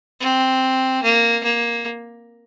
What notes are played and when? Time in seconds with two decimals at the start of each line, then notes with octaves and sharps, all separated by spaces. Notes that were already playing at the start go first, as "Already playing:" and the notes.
0.20 C4
1.03 A#3
1.43 A#3